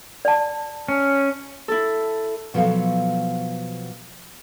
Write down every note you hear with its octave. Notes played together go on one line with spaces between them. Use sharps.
D5 A5
C#4
E4 A4
B2 F3 F#3 B3 A4 F5